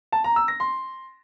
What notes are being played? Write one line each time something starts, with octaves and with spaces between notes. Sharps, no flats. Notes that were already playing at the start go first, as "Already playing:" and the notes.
A5
A#5
E6
A#6
C6